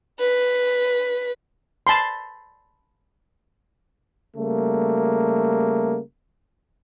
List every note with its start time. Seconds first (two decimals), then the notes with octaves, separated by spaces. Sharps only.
0.19 B4 B6
1.87 A5 B5 C6
4.36 C#3 G3 A3 A#3